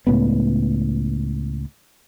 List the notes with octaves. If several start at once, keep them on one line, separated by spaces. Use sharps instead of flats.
C#2 A2 B3